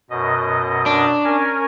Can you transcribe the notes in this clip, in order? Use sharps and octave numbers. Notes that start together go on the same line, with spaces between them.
F#2 B2 D#5
D4
C#4 A#4 G#5